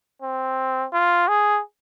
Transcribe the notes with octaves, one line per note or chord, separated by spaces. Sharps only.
C4
F4
G#4